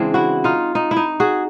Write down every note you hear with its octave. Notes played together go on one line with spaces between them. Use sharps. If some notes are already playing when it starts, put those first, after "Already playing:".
Already playing: C#3 E3 G#3 C4 D4
E4 F#4
D#4 F4
D#4
E4
D#4
F#4 G#4